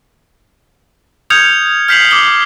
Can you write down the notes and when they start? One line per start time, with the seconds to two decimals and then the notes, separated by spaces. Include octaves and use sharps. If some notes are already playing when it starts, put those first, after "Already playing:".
1.30 D#6 F6 G6 G#6 C#7 F7
1.88 F6 G6 B6 C7 F7 F#7
2.11 D6 D#6 G7